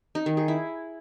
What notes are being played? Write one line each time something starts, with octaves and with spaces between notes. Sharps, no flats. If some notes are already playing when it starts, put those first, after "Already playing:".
D#4
D#3
G#4
E4